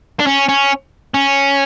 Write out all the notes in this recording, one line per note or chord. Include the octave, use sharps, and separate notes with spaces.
D4
C#4
C#4
C#4